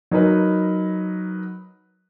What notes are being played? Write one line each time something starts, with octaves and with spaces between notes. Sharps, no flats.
F#3 D#4 A#4 B4 D#5